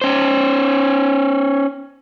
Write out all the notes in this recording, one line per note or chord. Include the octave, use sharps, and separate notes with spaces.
C#4 C5